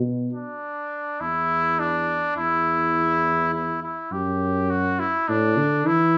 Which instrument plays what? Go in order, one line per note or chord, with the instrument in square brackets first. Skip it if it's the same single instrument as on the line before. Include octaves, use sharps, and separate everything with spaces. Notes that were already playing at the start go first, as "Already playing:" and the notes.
Already playing: [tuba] B2
[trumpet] D4
[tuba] E2 [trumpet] E4
[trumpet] D4
[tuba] E2 [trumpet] E4
[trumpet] E4
E4
[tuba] F#2 [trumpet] G4
[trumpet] F#4
E4
[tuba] A2 [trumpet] D4
[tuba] D3
[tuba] E3 [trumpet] E4